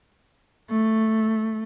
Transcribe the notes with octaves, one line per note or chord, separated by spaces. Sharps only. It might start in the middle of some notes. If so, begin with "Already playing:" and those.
A3